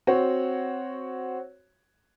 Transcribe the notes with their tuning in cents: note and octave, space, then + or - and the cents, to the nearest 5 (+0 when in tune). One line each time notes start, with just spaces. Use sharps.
C4 +0 F#4 +0 C#5 +0